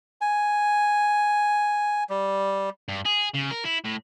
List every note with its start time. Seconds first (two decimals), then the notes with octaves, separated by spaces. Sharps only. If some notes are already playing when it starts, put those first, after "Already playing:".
0.21 G#5
2.09 G3
2.88 G2
3.06 G#4
3.35 C#3
3.51 A#4
3.66 E4
3.85 A2